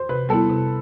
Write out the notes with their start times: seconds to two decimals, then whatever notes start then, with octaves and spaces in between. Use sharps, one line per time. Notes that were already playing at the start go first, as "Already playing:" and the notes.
Already playing: C5
0.09 C3 B4
0.29 G3 B3 E4 A4
0.50 C3